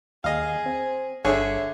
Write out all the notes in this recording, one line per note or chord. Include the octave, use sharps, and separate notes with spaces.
D#2 G#4 D#5 F5
C4
G1 D3 G#4 C#5 E5